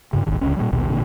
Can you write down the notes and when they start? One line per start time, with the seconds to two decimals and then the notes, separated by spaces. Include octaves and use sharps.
0.13 G2 C#3
0.26 D#1 G#1 D#3
0.41 D#1 C#2 D3 C#4
0.57 A#2 F3 G3
0.72 A#1 D#2 B2
0.89 A1 A#2 D3